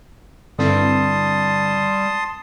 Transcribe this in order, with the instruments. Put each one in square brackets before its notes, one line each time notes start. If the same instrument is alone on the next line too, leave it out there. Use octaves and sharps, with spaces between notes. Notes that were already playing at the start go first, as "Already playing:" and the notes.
[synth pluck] G2 C4 E4 [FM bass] D3 [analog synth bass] G3 [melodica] A5 C6 D#6